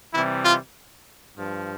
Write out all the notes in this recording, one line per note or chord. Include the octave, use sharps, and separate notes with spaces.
C3 E3 G3 E4
F4
G2 F3